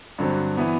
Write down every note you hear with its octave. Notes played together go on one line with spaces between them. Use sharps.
G2 D3 F#3 C4
E3 B3